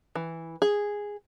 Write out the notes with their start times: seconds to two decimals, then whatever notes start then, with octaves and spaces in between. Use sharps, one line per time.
0.15 E3
0.62 G#4